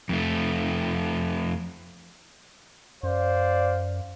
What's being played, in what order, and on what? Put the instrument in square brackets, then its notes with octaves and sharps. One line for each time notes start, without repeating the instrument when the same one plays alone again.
[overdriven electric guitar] F2 A3
[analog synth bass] F#2 [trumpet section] C5 D5 F5